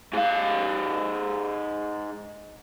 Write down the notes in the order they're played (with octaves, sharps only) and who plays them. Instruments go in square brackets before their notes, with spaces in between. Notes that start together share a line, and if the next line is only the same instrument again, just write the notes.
[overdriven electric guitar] G#2 F5